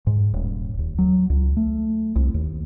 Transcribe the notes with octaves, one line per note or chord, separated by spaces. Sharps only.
G#2
D#1
D#2
F#3
C#2
A3
C2
D#2